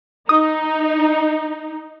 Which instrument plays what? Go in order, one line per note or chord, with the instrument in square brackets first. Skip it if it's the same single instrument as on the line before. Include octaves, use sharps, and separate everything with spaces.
[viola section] D#4 [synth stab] D#6